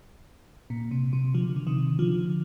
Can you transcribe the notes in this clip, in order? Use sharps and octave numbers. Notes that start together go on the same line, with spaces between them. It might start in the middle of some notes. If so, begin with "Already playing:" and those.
A#2
C3
C3
D3 F3
D3
C3 D#3
D3 F3